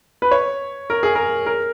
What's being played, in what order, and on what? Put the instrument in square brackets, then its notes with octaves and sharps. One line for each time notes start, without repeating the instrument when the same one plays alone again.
[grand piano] B4
C#5
A#4
G#4
A#4
A#4